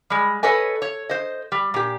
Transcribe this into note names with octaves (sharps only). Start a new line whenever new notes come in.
G3 G#3
A4 B4 C#5 D#5 G#5
C#5
C5 D#5
G3
A#2 G4